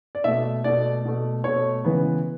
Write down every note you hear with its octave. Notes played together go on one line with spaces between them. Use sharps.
D5
B2 A3 E5
B2 A3 D5
B2 A3
B2 A3 C#5
C#3 E3 G#3 B3